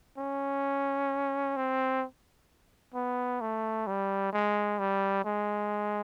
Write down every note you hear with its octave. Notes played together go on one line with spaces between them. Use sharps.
C#4
C4
B3
A3
G3
G#3
G3
G#3